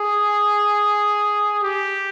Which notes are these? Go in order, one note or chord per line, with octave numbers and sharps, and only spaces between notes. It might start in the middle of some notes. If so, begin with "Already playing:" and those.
Already playing: G#4
G4